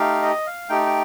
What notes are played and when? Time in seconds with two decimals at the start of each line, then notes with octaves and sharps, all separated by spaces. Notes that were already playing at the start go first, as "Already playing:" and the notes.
Already playing: A3 D#4 G4 F5
0.22 D#5
0.47 F5
0.69 A3 D#4 G4 G5
0.86 G5